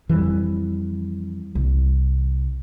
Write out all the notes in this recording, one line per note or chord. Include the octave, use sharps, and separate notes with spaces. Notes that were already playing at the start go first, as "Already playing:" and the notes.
F2 E3 G3
C2